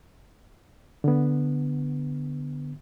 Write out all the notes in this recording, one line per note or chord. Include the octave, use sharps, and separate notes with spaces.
D3 B3